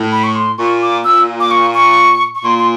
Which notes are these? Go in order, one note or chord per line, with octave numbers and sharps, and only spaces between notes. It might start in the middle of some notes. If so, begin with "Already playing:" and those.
Already playing: A2
B5
C#6
C6
A#2 C#6
D6
A#2 E6
D6
C#6
C#6
C#6
A#2 C6
C6